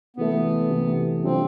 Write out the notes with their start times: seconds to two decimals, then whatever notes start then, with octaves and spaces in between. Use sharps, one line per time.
0.17 C3 E3 A3 B3
0.70 C3 E3 A3
1.24 C3 G3 C4 D4 F4